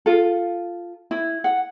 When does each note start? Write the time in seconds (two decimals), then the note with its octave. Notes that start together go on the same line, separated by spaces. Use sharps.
0.06 F4 A4
1.11 E4
1.44 F#5